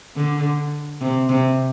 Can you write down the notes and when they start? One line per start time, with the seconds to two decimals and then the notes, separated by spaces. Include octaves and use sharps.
0.16 D3
1.01 C3
1.29 C3